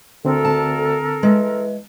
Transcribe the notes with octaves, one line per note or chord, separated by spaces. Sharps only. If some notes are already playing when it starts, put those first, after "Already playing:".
D2 D3 C4 A4 A#4
A5
E3 G#3